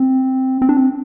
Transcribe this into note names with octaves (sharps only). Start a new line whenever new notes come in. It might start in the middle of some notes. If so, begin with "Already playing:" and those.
Already playing: C4
C4
D4
C4